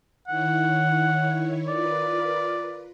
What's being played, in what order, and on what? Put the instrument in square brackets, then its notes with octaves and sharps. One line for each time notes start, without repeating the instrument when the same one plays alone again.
[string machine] D#3 E4 C#5 [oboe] F#5
[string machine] F4 A#4 B4 [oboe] D5